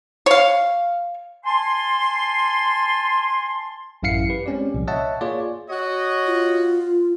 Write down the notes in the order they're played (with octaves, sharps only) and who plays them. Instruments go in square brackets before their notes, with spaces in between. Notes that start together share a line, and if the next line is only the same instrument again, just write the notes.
[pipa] C#5 F5
[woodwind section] G#5 A5 C6
[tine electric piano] A1 F#2 E4 F5 C7 C#7
G4 B4
G#3 C4 C#4 G4 D5
C2 A#2 F3
C#5 D#5 E5 F#5 A5
A#3 F4 G#4 C#5 D5
[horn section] F#4 C#5 D#5
[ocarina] F4